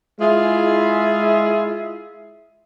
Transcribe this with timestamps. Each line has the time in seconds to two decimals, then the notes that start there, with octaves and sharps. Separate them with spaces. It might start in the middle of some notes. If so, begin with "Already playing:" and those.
0.20 G#3 E4 F4 G#4 E5